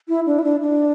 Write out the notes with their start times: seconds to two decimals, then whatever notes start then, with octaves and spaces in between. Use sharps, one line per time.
0.08 E4
0.26 D4
0.39 E4
0.44 D4
0.61 D4